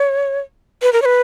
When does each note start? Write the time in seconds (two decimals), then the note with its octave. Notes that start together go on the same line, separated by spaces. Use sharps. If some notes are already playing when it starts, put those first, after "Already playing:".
Already playing: C#5
0.82 B4
0.93 A#4
1.02 C#5
1.05 B4